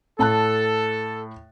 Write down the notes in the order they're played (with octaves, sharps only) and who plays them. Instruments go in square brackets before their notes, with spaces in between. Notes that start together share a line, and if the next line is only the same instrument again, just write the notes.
[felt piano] A2 A5 F#6 [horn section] A4